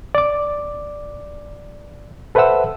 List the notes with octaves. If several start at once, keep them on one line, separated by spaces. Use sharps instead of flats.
D5 D6
A4 B4 C5 E5 F#5 E6